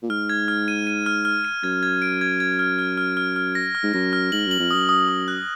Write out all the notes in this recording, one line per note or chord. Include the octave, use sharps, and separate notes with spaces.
A#2
G#2 F6
G#6
F6
D#7
D#7
F6
F6
D#7
F#2 G#6
G#6
D7
G#6
G#6
F6
F6
F6
F6
F6
A#6
F6
G#2
F#2 A#6
F6
G#2 F#7
F#2 F#7
F2
F#2 D#6
D#6
D#6
F#6